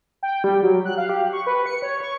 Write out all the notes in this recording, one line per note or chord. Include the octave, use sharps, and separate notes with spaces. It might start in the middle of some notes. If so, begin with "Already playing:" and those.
G5
G3
F#3
F#6
F5
G4
C#6
B4
C#7
C#5
C#6